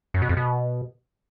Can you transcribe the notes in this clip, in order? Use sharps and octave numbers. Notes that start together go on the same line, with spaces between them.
F#2
B2
F2
B2